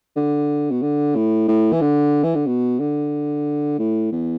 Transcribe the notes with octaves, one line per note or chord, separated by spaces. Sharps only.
D3
B2
D3
A2
A2
E3
D3
E3
D3
B2
D3
A2
E2